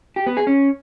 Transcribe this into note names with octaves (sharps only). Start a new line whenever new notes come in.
G4
B3
G#4
C#4